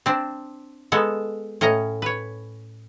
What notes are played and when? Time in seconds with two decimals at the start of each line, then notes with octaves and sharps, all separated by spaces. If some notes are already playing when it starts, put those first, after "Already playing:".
0.06 C4 D4
0.92 G#3 B3 A4
1.61 A2 C#4 D#5 A#5
2.02 B4 C#5